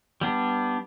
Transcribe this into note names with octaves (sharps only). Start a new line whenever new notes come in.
G3 B3 D4